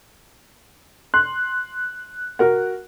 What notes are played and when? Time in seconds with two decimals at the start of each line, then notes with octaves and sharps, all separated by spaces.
1.14 C6 F#6
2.39 F#4 A#4 F#5